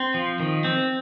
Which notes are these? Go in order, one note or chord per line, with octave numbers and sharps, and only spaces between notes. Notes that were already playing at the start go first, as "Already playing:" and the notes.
Already playing: C4
F3
D#3
C4